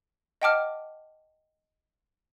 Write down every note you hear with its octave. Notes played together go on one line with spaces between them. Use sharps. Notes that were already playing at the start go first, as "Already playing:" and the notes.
D#5 F#5 G5 A5 D6 F6